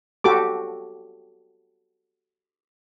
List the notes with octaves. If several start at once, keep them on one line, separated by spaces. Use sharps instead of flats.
F#4 G4 A4 D6